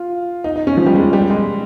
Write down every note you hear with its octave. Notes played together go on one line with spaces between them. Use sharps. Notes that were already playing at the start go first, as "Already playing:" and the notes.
Already playing: F4
D#4
D#4
C#4
F3
G3
G#3
G3
G#3